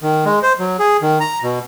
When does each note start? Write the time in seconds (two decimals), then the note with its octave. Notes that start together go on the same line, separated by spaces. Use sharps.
0.02 D#3
0.25 G#3
0.43 C5
0.59 F#3
0.79 G#4
1.02 D#3
1.20 A#5
1.43 B2